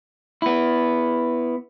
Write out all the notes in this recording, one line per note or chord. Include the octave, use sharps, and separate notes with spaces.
B3 E4